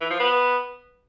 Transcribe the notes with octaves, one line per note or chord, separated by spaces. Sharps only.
E3
F3
B3